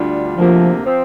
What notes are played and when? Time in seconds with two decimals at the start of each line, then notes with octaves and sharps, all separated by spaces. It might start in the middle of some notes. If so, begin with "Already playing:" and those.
Already playing: D2 D3 G3 D4 F4
0.36 D2 C3 F3 A#3
0.84 F3 C4